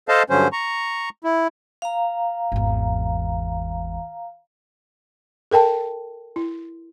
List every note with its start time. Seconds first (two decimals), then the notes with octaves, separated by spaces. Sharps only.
0.09 A4 C5 D#5 F5 A5
0.30 G2 D3 F#3 C#4 C5
0.53 A#5 C#6
1.24 E4
1.82 F5 A#5
2.52 G#1 E2
5.51 A4 A#4 G5 A5
6.36 E4